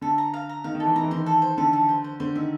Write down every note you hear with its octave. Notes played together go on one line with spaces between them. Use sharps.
D3 A4
A#5
F5
A#5
D#3 F5
D#3
A4
E3
D#3 A#5
E3
D#3 C5
A4
C5
D3 A4
A4
C5
C5
D3 C5
D#3 E5